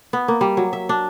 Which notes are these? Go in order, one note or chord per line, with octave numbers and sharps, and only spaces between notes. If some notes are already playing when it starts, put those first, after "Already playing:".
B3
A#3
G3
F#3
E5
D4